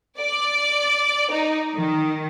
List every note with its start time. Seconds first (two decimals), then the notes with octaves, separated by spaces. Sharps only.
0.19 D5
1.30 D#4
1.76 D#3